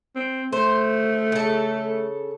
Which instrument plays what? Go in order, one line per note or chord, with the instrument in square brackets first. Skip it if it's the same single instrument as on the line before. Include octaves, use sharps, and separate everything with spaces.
[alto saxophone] C4
[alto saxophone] A3 [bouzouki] C5
[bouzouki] C#3 A4